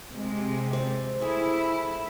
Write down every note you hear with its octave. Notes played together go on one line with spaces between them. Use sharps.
C3 G#3
C4 C5 D5
A3 E4 G#4